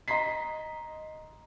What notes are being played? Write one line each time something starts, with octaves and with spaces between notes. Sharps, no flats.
D#5 A#5 C6 B6 C7